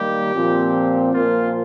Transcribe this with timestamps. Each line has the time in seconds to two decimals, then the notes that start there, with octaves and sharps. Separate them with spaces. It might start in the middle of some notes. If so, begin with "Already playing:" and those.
Already playing: D#3 G3 A#3 G4
0.34 A#2 F3 C4
1.14 A#2 F3 A#3 F4